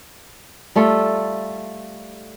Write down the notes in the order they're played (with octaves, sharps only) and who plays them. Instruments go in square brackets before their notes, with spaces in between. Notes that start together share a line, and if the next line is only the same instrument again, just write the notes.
[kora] G3 A3 F4 A4